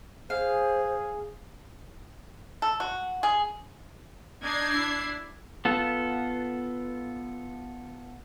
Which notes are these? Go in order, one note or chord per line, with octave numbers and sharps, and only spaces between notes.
G#4 C5 F5
A4
F#4
G#4
D4 D#4 G#6 C7
E4
B3 F4 A4